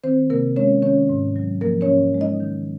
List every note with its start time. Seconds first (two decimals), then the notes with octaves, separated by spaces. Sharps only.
0.04 D#3 C4 C5
0.30 C3 A#3 A#4
0.56 G#3 C#4 C#5
0.82 D#3 C#4 C#5
1.09 G#2
1.36 F#3
1.61 F3 A#3 A#4
1.81 C#4 C#5
1.88 G#2
2.14 G#3
2.21 D#4 D#5
2.40 D#3